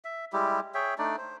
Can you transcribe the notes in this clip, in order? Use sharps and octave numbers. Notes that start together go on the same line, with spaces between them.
E5
G3 G#3 E4 G4
G#4 C#5 E5 G5
A3 D4 D#4 D5
C5